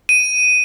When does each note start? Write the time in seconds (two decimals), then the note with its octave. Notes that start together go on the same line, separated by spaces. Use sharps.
0.09 D#7